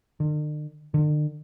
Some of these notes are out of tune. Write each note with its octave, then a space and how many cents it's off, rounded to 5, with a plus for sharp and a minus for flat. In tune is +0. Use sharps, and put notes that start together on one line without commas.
D3 +45
D3 +40